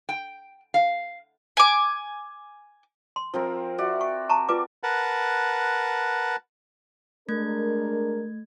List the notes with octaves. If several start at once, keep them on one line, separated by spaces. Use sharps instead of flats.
G5
F5
G#5 D6
C6
F3 C4 A#4
F#4 D5 E5
C#6
A5 A#5 C#6
F4 B4 D5 D6
A#4 B4 F#5 A5
G#3 A3 D4 A#4 G#6